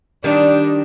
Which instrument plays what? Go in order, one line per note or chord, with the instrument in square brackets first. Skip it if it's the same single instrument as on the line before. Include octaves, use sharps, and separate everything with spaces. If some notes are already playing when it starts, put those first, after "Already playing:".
[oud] D#3 G3 [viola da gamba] D4